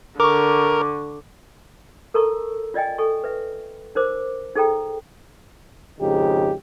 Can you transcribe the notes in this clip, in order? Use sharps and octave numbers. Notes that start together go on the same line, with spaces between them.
D3 A#4 C#6 D6
A4 A#4 A5 A#5 C#6 E6
F4 D5 D#5 G5 G#5
A4 G#5 C#6
B4 E5
D#4 A#4 C5 D6
D#4 G#4 A4 G5 A#5
G#1 F2 C#3 D#4 G4